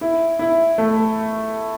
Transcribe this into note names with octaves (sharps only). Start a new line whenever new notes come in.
E4
E4
A3